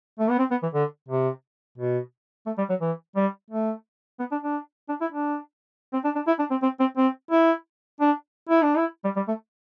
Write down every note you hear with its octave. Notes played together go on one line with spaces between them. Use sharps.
A3
B3
C4
B3
E3
D3
C3
B2
A3
G3
F#3
E3
G3
A3
B3
D4
D4
D4
E4
D4
C4
D4
D4
E4
D4
C4
C4
C4
C4
E4
D4
E4
D4
E4
G3
G3
A3